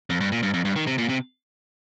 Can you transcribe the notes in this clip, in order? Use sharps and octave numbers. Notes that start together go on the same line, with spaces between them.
F2
G2
A#2
G2
F2
G2
D#3
C3
A#2
C3